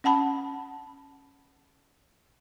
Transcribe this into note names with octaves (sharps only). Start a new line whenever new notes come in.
C#4 F#5 A5 B5